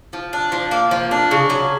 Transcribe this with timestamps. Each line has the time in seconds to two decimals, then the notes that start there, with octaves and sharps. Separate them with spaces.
0.13 F3
0.33 D4
0.52 F3
0.71 A#3
0.91 F3
1.11 D4
1.31 C#3
1.50 F#3